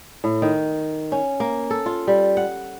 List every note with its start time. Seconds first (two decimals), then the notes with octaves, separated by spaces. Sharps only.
0.24 A2
0.42 D#3
1.12 C#4
1.40 A#3
1.70 A4
1.86 F4
2.07 G3
2.37 F#5